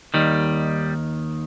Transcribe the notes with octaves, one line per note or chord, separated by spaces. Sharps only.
D#2 D#3 G3